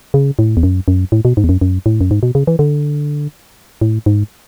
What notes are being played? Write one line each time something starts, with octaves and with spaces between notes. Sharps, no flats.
C#3
A2
E2
F#2
F#2
A2
B2
G#2
E2
F#2
F#2
A2
F#2
G#2
B2
C#3
E3
D3
A2
G#2